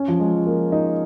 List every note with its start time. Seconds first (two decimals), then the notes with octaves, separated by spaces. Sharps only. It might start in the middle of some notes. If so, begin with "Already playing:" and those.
Already playing: C#4
0.08 F3
0.20 G#3
0.46 A#3
0.72 D#4